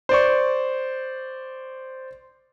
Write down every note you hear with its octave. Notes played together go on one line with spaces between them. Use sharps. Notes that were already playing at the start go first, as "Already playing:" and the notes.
C5 D5 C#6